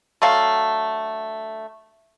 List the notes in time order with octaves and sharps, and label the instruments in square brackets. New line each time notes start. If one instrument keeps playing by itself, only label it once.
[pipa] D3 F#3 A3 F5